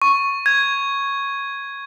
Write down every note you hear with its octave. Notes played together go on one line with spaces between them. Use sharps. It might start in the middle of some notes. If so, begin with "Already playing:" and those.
C#6
G#6